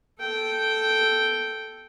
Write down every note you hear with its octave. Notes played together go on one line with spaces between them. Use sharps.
A4 G5